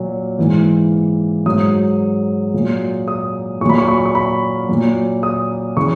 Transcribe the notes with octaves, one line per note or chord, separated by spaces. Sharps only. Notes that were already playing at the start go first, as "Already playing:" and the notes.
Already playing: A#2 F#3
G#2 E3
G#2 F#3 D#6
A#2 F#3
D#6
A#2 F#3 B5 C#6
C#6
C#6
C#6
B5
A#2 F#3
D#6
C#3 E3 C#6